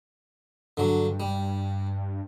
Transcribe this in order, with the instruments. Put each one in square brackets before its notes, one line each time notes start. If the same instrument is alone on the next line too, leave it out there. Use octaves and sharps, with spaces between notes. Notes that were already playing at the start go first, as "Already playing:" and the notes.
[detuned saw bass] G2 [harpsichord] D3 F#3
[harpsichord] G3